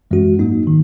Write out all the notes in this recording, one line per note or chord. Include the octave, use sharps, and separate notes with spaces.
F#2 E3 G#3 C#4 F#4
G#2 F#3 A#3 D#4
D#3